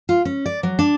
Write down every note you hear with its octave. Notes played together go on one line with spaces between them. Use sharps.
F4
C#4
D5
F#3
D4